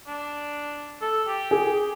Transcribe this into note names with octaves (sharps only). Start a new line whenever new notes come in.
D4
A4
G4
G#4